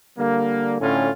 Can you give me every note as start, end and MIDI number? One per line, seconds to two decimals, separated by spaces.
0.18 0.77 50
0.18 0.77 55
0.18 0.77 58
0.81 1.10 45
0.81 1.10 50
0.81 1.10 61
0.81 1.10 65
0.81 1.10 80